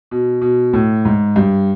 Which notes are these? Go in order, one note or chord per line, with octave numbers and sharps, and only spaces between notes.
B2
B2
A2
G#2
G2